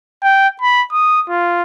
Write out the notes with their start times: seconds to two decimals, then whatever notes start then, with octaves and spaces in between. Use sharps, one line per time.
0.22 G5
0.61 B5
0.93 D#6
1.29 F4